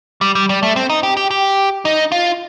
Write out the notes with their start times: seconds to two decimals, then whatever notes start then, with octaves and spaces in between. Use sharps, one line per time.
0.21 G3
0.35 G3
0.49 G3
0.63 A3
0.76 C4
0.89 D#4
1.03 G4
1.17 G4
1.31 G4
1.85 D#4
2.12 F4